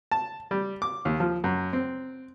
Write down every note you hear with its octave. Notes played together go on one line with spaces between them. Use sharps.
A5
G3
D6
D#2
F3
F#2
C4